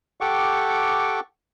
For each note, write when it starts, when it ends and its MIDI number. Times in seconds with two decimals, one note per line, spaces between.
0.21 1.20 67
0.21 1.20 69
0.21 1.20 78
0.21 1.20 79
0.21 1.20 85
0.21 1.20 86